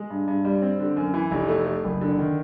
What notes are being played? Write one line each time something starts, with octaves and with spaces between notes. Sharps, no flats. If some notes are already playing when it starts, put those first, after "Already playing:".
Already playing: G#3
G2
G2
G3
C4
D3
F#2
E3
F1
A3
A3
F#1
D3
D#3